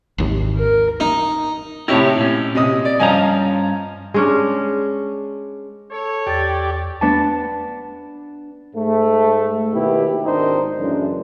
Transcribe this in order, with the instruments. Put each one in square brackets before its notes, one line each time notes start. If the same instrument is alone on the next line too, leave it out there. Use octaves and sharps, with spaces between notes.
[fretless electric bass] G#1 D#2
[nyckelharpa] A#4
[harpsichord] D#4
[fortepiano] A2 C3 E4 [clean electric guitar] D#4 G4 C#5
[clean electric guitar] A#2 C#4
[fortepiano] C3 D#5 D#6
D5
[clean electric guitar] G2 C#4 A#5 [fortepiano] F3 D#5 G#5
[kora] G#3 C#4 D4
[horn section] A4 C#5
[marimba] E2 A6 [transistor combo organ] G4 D5
[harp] B3 D4 A5
[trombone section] G#2 A3
D#2 B2 B3 E4 G4
G#1 D#3 D4 D#4 C5
F#2 A2 C#3 E3 D4